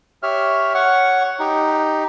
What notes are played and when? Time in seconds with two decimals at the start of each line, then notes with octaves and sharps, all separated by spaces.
0.23 G4 C#5 E5 F6
0.75 C#5 F#5 C#6
1.40 D#4 G4